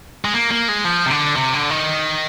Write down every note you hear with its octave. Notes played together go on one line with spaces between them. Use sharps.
G#3
A#3
A#3
G#3
F3
C3
D3
C3
D3
D#3